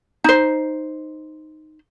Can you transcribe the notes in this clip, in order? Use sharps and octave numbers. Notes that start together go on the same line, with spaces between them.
D#4 C5